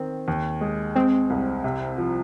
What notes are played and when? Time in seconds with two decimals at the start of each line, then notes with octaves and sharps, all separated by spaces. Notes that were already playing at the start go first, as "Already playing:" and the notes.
Already playing: D#3 C4
0.28 D#2
0.61 G#3
0.95 G#3 C4
1.30 C2
1.64 C3
1.98 F3